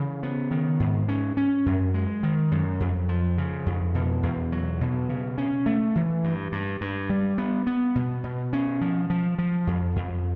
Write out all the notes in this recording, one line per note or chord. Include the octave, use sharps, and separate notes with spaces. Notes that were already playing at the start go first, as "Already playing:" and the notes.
Already playing: C#3 E3
B3
D#3
G#2
C#4
C#4
F#2
G#3
D#3
F#2
F2
F3
C#3
F2
B2
E2
F#3
B2
C#3
C#4
A3
E3
G2
G2
G2
G3
B3
B3
B2
B2
C#4
F3
F3
F3
F2
F2